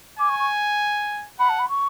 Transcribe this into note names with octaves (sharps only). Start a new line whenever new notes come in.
G#5 D6
C#6
C#6
F#5 B5
A5
B5
C#6